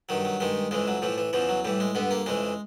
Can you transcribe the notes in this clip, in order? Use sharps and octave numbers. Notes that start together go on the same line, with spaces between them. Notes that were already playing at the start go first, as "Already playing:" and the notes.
G2 D#3 F#3
F#3
G2 D#3 G#3
F2 C#3 E3 G#3
F#3
A2 E3 F3
E3
E2 C#3 E3 F3
F#3
A2 E3 G3
G#3
G2 D3 B3
A#3
F2 C#3 E3 G#3